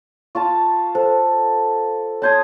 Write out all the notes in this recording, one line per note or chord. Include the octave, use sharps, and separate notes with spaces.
F4 F5 A5 C#6
A4 C5
C#5 A5 C6 D#6 G6 G#6